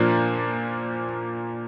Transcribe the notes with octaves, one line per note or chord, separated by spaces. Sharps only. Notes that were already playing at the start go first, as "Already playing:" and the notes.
Already playing: A#2 F3 A#3 D4